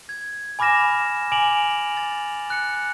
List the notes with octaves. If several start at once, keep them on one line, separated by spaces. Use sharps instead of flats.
G#6
G#5 B5 D6 F6 A#6 E7
G#5 D6 D7 F7 F#7
A6
F#6 C#7